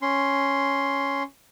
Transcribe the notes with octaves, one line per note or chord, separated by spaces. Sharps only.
C#4 C6